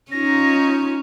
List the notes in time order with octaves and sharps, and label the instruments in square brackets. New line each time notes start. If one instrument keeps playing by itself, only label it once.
[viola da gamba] C#4 [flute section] D#4 F4 [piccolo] A#6